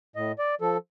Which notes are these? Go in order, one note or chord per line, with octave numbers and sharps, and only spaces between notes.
A2 D#5
D5
F3 A4